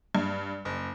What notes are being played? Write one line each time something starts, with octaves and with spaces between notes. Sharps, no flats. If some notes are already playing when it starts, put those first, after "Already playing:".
G2
F#1